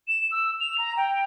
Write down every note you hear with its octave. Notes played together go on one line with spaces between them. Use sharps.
E7
E6
F7
A#5
G5